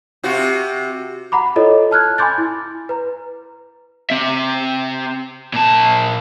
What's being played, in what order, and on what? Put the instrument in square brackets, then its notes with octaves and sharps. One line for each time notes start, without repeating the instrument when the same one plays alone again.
[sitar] C3 F4 F#4
[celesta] F#5 A#5 B5 D6
E4 F4 A4 C#5 D#5
A5 F6 F#6 G#6
G#5 B5 C6 D6 G6 A6
E4
B4 A#5
[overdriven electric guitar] C4 E5
A#2 A5